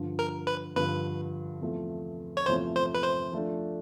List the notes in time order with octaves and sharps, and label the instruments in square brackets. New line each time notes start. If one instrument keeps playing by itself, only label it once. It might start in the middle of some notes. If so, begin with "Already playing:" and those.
Already playing: [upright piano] G2 D3 F3
[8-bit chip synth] A#4
B4
[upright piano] G2 D3 F3 [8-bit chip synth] B4
[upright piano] E2 C3 F3 A3
[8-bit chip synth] C#5
[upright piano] E2 C3 F3 A3 [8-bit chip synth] C5
[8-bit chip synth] C5
B4
C5
[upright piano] F3 A3 D4